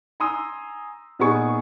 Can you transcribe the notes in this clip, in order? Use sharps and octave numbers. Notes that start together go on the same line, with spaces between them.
G#5 A#5 C6 D#6 E6
A#2 B3 D#4 G#4 C#6